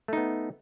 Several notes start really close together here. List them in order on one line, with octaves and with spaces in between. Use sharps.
A3 D#4 B3